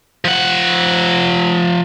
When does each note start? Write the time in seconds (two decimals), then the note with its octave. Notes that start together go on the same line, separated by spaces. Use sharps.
0.25 F3 F#5